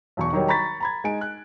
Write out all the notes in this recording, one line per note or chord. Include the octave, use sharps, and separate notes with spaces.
B1 E2 C#6
D#3 F#3 G3 D#4 C#5
A#5 B5 C#6 A6 B6
A#5 B5 G#6
G#3 D#4 G#5 D7
F#6